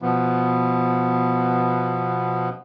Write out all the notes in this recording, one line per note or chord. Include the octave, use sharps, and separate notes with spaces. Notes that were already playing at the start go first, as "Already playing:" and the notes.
B2 F3 B3